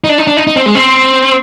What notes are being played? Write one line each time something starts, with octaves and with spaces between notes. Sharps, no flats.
D#4
D4
D#4
D4
D#4
D#4
C4
G#3
C4